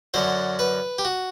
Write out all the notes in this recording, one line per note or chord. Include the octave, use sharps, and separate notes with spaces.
F#2 D3 F#3 C5
B4
G4
F#4